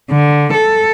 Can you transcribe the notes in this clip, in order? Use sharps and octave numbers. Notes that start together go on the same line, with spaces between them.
D3
A4